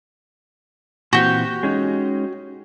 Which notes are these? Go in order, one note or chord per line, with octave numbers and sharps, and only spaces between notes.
A#2 E3 C4 F#4 G4
G#3 C#4 D#4